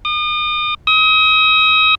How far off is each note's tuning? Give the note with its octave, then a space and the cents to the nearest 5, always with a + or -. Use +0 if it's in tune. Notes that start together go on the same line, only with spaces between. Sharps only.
D#6 -40
D#6 +35